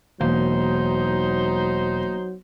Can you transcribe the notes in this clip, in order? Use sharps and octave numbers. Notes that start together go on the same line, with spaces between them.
E1 F#3 A#3 D#4 C5